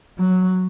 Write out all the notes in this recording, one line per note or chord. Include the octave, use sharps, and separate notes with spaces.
F#3